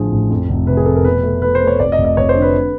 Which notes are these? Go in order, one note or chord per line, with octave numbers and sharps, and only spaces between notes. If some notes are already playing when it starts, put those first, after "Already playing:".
Already playing: A1 D3 F3 G#4
A1
F2
F1
C3 B4
G#4
F2 A4
A#4
B2 B4
A3
A3 B4
C5
A3
C#5
F1 D5
D#5
F1
D#5
F1 C#5
C5
D3
B4